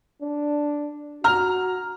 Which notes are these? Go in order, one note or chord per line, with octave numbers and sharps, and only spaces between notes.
D4
F#4 A#5 F6